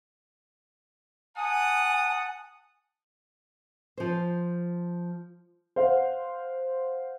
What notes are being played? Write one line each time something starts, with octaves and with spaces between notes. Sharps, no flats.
F#5 G#5 A5 D#6
F3 C5
C5 F5 F#5